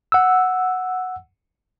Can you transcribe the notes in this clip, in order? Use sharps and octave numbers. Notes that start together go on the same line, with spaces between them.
F#5 E6